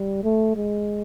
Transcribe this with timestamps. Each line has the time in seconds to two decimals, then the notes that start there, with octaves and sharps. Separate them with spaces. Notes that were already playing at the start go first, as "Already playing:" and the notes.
Already playing: G3
0.24 A3
0.56 G#3